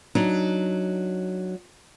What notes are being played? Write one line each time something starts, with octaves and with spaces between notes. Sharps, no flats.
F#3 D4 D#4